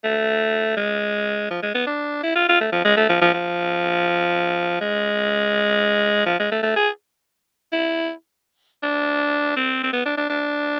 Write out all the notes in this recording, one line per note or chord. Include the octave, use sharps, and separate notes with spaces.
A3
G#3
F3
G#3
B3
D4
E4
F4
F4
A3
F3
G#3
A3
F3
F3
F3
G#3
F3
G#3
A3
A3
G#4
E4
D4
C4
C4
B3
D4
D4
D4